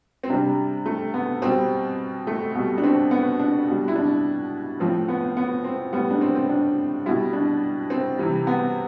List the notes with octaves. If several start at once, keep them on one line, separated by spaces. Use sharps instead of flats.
C4
C3 G3 D4
A3
B3
B2 G3 C4
A3
B2 G3
D4
C4
B3
D4
B2 G3
E4
D4
A2 F3 C4
B3
B3
C4
A2 G3 B3
D4
C4
C4
D4
B2 G3 E4
D4
C4
C3 E3 G3
B3